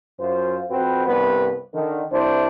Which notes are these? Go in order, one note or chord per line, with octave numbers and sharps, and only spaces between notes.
F#2 F4 C5
F2 C4 F#4 B4 C5
C2 G2 B3 B4
D3 D#3
C2 D4 E4 C5